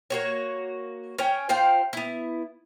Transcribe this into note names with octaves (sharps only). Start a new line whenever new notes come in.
A#3 F#4 C#5
C#4 C#5 G5 G#5
F4 C5 F5 G5
B3 E4